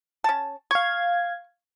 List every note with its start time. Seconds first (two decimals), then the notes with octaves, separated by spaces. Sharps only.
0.24 C#4 A5
0.71 F5 C#6 G#6